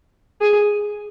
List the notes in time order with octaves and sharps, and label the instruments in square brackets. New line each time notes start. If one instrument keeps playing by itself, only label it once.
[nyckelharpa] G#4